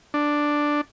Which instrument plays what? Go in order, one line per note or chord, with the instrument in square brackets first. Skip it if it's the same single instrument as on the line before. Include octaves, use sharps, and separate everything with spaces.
[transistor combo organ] D4